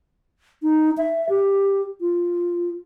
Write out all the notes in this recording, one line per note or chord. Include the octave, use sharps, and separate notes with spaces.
D#4
E5
G4
F4